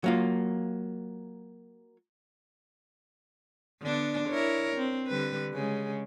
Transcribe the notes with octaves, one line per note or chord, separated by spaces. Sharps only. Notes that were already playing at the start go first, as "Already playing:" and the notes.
F#3 A#3 F4
D3 B3 D4
E4 A#4 C#5
C4
D3 G3 B4
C#3 G#3